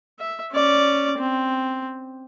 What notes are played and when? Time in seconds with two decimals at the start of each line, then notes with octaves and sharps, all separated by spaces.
0.19 E5
0.52 C#4 D5
1.18 C4